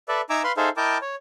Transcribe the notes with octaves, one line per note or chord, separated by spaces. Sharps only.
A4 B4 D5 E5
D#4 E5 G#5 A#5 D6 E6
B4 F5 B5 C6
D#4 G#4 A4 C5 E5 F5
E4 A#4 D#5 G5 A5 D6
C#5